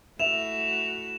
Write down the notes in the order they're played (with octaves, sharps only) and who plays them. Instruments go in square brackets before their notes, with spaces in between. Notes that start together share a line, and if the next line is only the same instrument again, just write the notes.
[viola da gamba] A3 E4 F#4 [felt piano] E5 [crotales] E7 F7